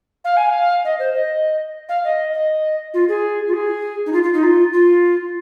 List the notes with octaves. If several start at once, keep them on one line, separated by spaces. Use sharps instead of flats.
F5
G#5
F5
D#5
C5
D#5
F5
D#5
D#5
F4
G#4
F4
G#4
D#4
F4
F4
D#4
F4
F4